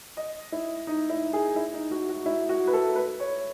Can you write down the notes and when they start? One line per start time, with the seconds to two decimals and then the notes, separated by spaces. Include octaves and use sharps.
0.17 D#5
0.52 E4
0.87 D#4
1.10 E4
1.33 G#4
1.56 E4
1.74 D#4
1.91 F#4
2.09 F#4
2.26 E4
2.49 F#4
2.67 B4
2.73 A4
2.95 B4
3.20 C#5